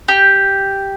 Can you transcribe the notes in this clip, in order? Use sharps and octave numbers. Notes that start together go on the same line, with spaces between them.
G4